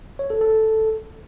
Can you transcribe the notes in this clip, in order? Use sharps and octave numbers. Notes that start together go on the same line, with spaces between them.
C#5
A4
A4